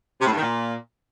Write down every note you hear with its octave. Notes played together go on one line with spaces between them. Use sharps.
C3
A2
G2
D#3
A#2